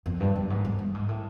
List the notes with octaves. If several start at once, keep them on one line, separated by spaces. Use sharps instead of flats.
F2
G2
F#2
G#2
G#2
G2
G#2
A2